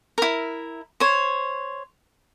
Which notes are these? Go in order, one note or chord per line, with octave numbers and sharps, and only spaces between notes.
E4 A#4
C5 C#5